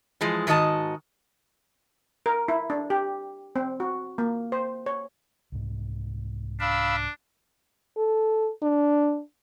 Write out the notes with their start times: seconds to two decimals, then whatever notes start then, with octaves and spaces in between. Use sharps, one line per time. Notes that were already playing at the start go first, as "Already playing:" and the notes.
0.21 E3 F3 G#3
0.47 G#2 D#3 F#4 D#5 A5
2.26 A#4
2.48 E4
2.70 D4
2.90 G4
3.56 C4
3.80 F#4
4.18 A#3
4.52 C5
4.86 C#5
5.52 C2 G#2
6.60 D4 F5 B5 E6
7.97 A4
8.62 D4